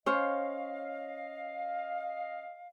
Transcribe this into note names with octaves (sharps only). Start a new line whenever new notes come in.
C#4 C5 C#5 D#5 F5